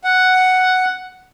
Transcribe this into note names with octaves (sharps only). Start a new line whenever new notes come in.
F#5